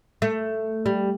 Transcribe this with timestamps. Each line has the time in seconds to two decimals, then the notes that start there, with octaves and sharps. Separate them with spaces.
0.22 A3
0.86 G3